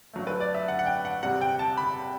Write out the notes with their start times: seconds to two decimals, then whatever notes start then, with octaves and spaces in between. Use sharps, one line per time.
0.13 G2 F#3 A3
0.27 B4
0.40 D5
0.55 E5
0.68 F#5
0.79 F#5
0.86 G5
1.05 F#5
1.23 E2 C3 G3 F#5
1.41 G5
1.59 A5
1.77 B5